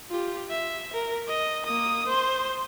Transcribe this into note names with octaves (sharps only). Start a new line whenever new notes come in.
F4 G4
E5
A#4
D#5
A#3 D#6
C5 C6